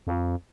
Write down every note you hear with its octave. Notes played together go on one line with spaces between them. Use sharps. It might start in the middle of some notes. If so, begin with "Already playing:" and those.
F2